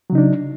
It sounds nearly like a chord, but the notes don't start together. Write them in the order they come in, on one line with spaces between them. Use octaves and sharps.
F#3 C#3 D#4 D4